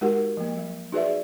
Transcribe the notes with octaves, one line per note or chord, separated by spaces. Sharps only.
G#3 D#4 F#4 G4 A#4 F#5
F3 A#3
F#3
D#4 F#4 G#4 B4 D5 E5